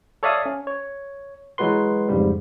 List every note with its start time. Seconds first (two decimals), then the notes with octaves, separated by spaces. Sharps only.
0.23 A4 C#5 D5 E5 F5 D#6
0.46 C#4
0.67 C#5
1.58 E3 F#3 G#3 F#4 B4 C6
2.09 F2 G#2 C#3 G3